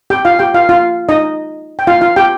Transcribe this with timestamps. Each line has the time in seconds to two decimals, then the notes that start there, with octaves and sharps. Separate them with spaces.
0.10 G4 G5
0.25 F4 F5
0.39 G4 G5
0.54 F4 F5
0.69 F4 F5
1.09 D#4 D#5
1.79 G5
1.87 F4 F5
2.01 F4 F5
2.16 G4 G5